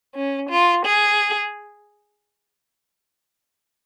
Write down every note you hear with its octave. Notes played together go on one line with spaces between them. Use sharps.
C#4
F4
G#4